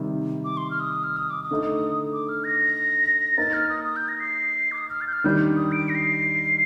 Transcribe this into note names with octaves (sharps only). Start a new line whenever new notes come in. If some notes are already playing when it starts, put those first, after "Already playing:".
Already playing: C3 D#3 G3
D6
C6
F6
D#6
F6
D#6
D6
D#6
D3 A3 D#4 A4
D6
F6
A#6
A#3 D#4 A#4 A6
F6
D#6
D#6
G6
A#6
C7
D6
D#6
F6
A6
G6
F6
D#3 G3 D4 G6
D#6
D7
A#6
C7